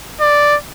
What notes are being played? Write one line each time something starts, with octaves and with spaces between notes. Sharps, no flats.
D5